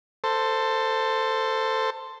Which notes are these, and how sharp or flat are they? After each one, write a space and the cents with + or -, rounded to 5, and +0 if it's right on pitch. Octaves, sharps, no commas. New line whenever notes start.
A4 +20 C5 +0